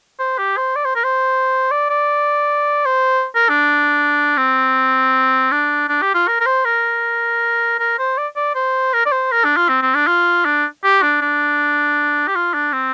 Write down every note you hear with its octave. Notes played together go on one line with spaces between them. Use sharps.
C5
G4
C5
D5
C5
A#4
C5
D5
D5
C5
A#4
D4
C4
D4
D4
G4
F4
A#4
A#4
C5
A#4
A#4
C5
D5
D5
C5
A#4
D5
C5
A#4
D4
F4
C4
C4
D4
F4
D4
G4
D4
D4
G4
F4
D4
C4